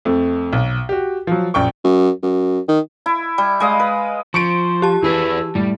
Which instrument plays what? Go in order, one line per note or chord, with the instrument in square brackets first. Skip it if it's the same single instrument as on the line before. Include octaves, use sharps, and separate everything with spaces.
[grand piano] F2 A3
B1
F#4 G4
F3 F#3
A#1 F#2 G5 C#6
[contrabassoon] F#2
F#2
D#3
[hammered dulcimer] E4
G3
G#3 D#5 F5
B4
[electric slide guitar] F3 [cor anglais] C5 [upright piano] C#6 C#7 D7
[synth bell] G4 A5
[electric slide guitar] E2 G#4 B4 [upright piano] E3 [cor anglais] E4
[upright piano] A2 [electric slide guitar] G3